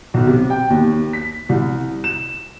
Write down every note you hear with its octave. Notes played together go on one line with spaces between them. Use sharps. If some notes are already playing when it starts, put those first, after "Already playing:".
B1
C3
G5
D#2
B6
C2
E7